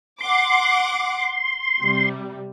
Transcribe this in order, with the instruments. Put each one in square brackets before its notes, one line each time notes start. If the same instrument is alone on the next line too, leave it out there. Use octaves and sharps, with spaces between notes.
[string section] F#5 D6 [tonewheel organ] C6
[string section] C3 G3